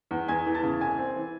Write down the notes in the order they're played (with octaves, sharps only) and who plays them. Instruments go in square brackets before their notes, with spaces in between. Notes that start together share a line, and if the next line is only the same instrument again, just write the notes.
[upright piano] E2
E2 G#5 G#6
E3
A5 A6
C#3
C2 G#5 G#6
C4
E3